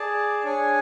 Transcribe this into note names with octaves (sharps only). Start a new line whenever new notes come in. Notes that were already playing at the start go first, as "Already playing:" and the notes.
Already playing: G#4 D5 A5
D4 G#4 C#5 G#5